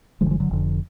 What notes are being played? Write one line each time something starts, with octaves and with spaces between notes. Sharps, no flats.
F#1 F2 D3 F3 G#3
F3 G#3
D3 F#3
F1 F2 D3